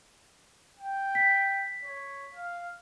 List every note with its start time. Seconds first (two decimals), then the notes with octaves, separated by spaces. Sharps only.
0.78 G5
1.15 B6
1.83 C#5
2.35 F5